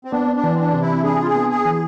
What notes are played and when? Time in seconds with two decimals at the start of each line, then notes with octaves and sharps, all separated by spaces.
0.05 C4
0.12 B3 D4
0.36 D4
0.43 E3
0.54 C4
0.59 D4
0.73 C3
0.81 E4
1.04 D4 G#4
1.21 F4
1.27 G#4
1.35 B3
1.50 G#4
1.65 E3